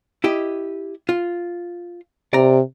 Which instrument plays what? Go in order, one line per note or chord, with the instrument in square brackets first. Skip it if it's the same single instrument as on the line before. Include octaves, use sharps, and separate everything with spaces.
[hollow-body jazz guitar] E4 G4 D#5
F4
[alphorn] C3 [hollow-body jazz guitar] D5 A#5